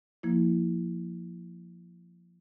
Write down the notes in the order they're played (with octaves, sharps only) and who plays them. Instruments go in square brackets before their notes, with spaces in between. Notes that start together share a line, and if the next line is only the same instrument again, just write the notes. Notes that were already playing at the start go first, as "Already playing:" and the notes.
[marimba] F3 A#3 E4